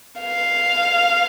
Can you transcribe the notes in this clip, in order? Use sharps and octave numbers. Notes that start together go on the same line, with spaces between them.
F5